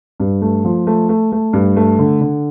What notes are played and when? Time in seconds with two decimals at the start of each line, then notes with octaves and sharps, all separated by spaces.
0.20 G2
0.42 A3
0.65 F3
0.87 A3
1.09 A3
1.32 A3
1.53 G2
1.76 A3
1.99 D3
2.21 D3